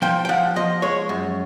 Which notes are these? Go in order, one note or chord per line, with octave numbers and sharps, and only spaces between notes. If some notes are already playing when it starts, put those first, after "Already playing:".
F3 G5
G5
F3 F#5
F3 D#5
G#3 C#5
F#2